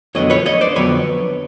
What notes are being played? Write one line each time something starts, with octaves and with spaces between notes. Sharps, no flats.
F2 D3 F#3 B3 C#5 D#5
B4 C#5
C#5 D#5
C5 D5
F2 D3 F#3 B3 B4 C#5